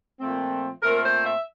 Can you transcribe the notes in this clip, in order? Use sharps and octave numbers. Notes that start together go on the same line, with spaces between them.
A#2 F3 A3 C4
A#2 A3 C4 A#4
C5
E5